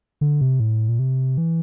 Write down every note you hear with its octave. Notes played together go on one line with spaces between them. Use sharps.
D3
C3
A2
A#2
C3
E3